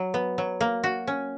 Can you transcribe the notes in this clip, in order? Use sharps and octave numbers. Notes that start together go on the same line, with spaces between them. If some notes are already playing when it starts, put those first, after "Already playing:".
Already playing: F#3
B3
F#3
A#3
F#4
C#4